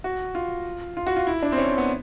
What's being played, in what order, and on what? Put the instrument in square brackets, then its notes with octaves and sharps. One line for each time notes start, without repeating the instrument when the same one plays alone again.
[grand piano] F#4
F4
F4
F#4
F4
E4
D4
C4
C#4
B3